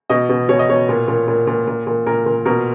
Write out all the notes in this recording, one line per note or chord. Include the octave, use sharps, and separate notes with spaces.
B2 D#5
B2
B2 C#5
D#5
B2 C#5
A#2
A#2
A#2
A#2
A#2
A#2
A#2 A#4
A#2
B2 A#4